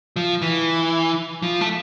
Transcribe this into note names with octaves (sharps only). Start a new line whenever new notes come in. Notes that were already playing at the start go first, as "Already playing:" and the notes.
F3
E3
F3
A3